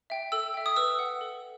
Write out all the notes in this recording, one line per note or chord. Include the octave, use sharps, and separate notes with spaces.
E5 G5
A4 E6
E5 G5
D#6
B4 E6
F#5
A4